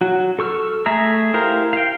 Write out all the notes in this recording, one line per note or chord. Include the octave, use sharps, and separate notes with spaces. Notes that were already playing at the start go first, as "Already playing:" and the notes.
F#3 F#4
A4 C#6 E6 F6
A3 G#4 E5 A#5 E6
E4 G4 A#4 C5 F5
F5 G5